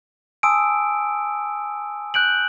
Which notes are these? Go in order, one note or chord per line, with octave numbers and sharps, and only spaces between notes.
G#5 A5 C6 D#6 E6 D7
F#6 G6 D7 F#7